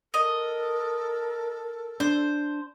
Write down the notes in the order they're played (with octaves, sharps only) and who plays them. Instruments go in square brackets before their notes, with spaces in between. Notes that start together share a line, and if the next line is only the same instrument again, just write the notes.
[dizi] A4 [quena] A#4 [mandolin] D#5
[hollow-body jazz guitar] D4 [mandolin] C5